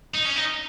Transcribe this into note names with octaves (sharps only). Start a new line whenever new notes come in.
D#4
C#4
D#4